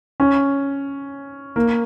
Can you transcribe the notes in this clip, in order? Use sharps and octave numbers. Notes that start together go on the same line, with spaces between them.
C#4
A#3